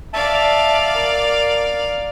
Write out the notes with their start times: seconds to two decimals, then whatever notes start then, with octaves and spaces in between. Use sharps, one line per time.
0.13 D5 E5 F5 A5
0.95 A#4